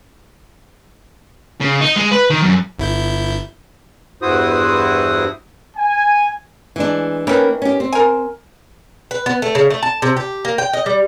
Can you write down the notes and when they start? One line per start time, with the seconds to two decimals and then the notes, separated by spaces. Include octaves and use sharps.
1.61 C#3
1.81 D#4
1.96 G#3
2.12 B4
2.30 D#3
2.42 F#2
2.79 G1 E4 G6
4.22 E2 G2 E4 F#4 C5 D#6
5.77 G#5
6.76 E3 G#3 D4
7.27 D#3 E3 A#3 C#4 B4
7.62 C#4 G4
7.80 C4
7.92 A#4 G#5
9.11 B4
9.26 B3
9.42 A3
9.55 C#3
9.70 A3
9.83 A5
10.02 C3
10.17 G4
10.45 A#3
10.58 G5
10.73 D#5
10.86 G3